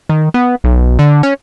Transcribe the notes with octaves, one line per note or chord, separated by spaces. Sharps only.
D#3
B3
B1
D3
C#4